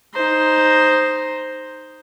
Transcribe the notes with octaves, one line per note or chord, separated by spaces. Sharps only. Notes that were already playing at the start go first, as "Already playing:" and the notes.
D#4 C5